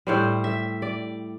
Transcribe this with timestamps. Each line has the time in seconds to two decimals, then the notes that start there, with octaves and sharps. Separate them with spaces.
0.07 A2 G3 C5
0.44 E5
0.82 D5